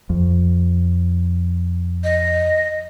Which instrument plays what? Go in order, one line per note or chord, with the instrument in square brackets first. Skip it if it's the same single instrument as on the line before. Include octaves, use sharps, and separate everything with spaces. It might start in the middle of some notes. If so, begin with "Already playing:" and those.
[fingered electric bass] F2
[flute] D#5